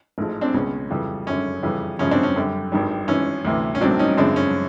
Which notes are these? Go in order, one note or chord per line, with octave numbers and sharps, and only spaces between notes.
A1 G#2 F3 G#3
C4 D4
C#2 B2 G#3 C#4
F2 C#3 E3 G3
G#1 F#2 D3 C#4
F2 C#3 E3 G3
F#2 C#3 F3 G#3 C#4
C4 D4
C#4
F#2 D3 G3
G#1 G2 D#3 G3
G#1 G#2 E3 C#4
D2 C3 E3
C#4
A1 G2 D#3 F#3 C4 D4
C#4 D#4
F#2 C#3 F3 G#3 C4 D4
C#4